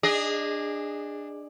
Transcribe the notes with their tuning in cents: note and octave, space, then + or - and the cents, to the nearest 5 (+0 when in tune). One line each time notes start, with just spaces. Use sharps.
D4 +10 G#4 -20 D#5 +0